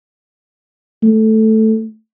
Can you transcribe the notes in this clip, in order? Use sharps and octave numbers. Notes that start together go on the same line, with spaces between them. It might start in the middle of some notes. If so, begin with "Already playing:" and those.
A3